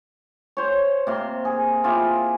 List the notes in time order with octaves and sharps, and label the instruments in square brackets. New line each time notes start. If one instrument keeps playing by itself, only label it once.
[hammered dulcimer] C5 C#5
C3 A#3 C6
G#4
E4 F4 G4 G#4